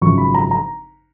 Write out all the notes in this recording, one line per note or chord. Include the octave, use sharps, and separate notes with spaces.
G#1 F#2 C#3 F3 C#6
B5
A#5
A#5